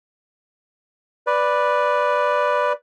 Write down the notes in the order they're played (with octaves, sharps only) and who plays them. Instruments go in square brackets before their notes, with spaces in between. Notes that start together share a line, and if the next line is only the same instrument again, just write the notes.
[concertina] B4 D5